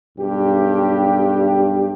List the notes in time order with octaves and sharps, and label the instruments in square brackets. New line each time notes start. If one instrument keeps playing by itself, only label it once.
[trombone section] B1 G2 G4